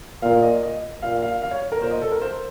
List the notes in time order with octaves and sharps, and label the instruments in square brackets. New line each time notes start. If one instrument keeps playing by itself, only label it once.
[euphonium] A#2 [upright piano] F5
[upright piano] D#5
D#5
[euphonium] A#2 [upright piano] F5
[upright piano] F5
F5
C#5
A#4
[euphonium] A#2 [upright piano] C5
[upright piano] D#5
A4
A#4
C5